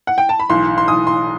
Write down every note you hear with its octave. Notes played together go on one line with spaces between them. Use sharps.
F#5
G5
A5
B5
B1 A2 E3 C6
C6
B1 A2 E3 D#6
C6